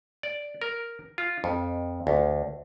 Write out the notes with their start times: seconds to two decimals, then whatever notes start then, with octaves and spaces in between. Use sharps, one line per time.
0.23 D5
0.62 A#4
1.18 F4
1.44 F2
2.07 D2